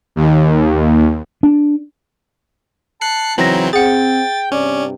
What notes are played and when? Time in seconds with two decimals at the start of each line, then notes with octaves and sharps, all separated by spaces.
0.16 D#2
1.43 D4
3.01 A5 F#6 C7 C#7
3.38 C#3 E3 F#3 C4 D#4 A#6 F#7
3.73 C4 G#4 F#5 G5 A6
4.52 G2 C3 C#4 D5